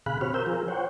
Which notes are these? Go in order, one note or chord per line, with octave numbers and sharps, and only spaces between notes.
B2 D3 G#4 F5 B5 F#6
C4 F#4 G4 C5 C#5 F6
A#4 C5 E6 G6
F3 F4 G#4 A#4
C5 C#5 F#5 G5